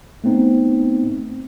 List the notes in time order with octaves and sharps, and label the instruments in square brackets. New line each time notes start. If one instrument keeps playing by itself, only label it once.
[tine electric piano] A3 B3 C4 D#4